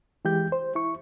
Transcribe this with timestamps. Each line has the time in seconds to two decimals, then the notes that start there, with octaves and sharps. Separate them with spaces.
0.25 E3 G#3 G4 G6
0.52 C5
0.75 E4 C#6